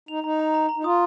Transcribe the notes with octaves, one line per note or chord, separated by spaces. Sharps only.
D#4 F7
D#4 A#5
A#5
A#5
A#5
D#4
F4 D#6